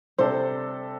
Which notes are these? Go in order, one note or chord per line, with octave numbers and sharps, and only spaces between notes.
C3 G3 D4 A4 C5